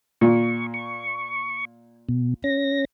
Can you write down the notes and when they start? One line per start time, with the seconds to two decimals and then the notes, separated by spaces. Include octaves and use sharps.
0.21 A#2 C#6
0.74 C#6
2.09 B2
2.44 C#4 A#6